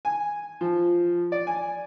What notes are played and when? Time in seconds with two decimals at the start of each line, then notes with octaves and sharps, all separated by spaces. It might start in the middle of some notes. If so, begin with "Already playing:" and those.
0.05 G#5
0.61 F3
1.32 D5
1.47 G#5